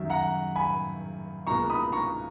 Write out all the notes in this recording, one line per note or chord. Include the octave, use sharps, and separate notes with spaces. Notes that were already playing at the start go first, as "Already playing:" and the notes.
Already playing: F#2 D#3 F#3 E5
F#5 A#5
G#5 B5
C#2 B2 A#3 A#5 C#6
B5 D#6
A#5 C#6